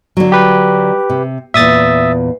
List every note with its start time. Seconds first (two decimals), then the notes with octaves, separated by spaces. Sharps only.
0.17 D3 F#3
0.32 G4 B4
1.10 C3
1.54 E2 A#2 E5 D#6 A6